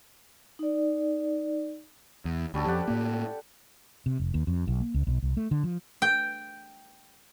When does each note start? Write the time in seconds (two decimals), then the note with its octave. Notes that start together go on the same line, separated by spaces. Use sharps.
0.59 D#4 D5
2.25 E2
2.54 D2 G3 C#4 A4
2.66 F2 G4 D5 F#5
2.88 A2 A#3
4.06 C3
4.20 F1
4.34 D#2
4.47 F2
4.67 B1
4.80 A#3
4.94 C#2
5.07 B1
5.22 C2
5.37 A3
5.51 D3
5.64 F3
6.02 G5